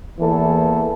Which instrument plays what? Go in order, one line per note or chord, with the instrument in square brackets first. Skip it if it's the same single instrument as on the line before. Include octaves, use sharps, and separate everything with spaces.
[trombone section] E2 E3 A#3 A4